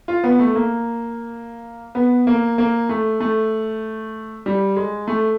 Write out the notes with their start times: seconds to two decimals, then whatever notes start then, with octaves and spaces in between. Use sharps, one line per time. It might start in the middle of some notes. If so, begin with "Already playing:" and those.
0.08 F4
0.24 B3
0.39 A3
0.55 A#3
1.95 B3
2.27 A#3
2.58 A#3
2.89 A3
3.20 A3
4.46 G3
4.76 G#3
5.08 A3